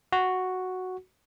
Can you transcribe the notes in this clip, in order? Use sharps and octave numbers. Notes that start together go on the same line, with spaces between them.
F#4